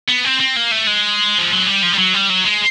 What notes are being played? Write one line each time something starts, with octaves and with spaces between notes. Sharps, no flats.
B3
C4
C4
A#3
A3
G#3
F3
F#3
G3
F3
G3
F#3
G3
F#3
G#3